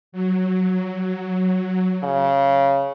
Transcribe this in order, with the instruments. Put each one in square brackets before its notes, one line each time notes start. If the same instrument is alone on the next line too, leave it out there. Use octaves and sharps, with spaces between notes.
[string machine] F#3
[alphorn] C#3